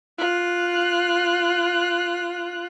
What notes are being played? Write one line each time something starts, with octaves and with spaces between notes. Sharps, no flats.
F4 F#6